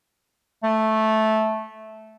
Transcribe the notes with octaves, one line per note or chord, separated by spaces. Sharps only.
A3